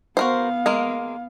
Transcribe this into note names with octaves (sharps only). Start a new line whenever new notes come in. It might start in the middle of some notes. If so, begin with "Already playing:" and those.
B3 F#4 A#4 C5 F5
G#3 A#3 A#4